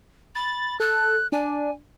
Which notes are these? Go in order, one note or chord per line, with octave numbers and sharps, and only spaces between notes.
B5 A6
A4 F#6
D4 G#5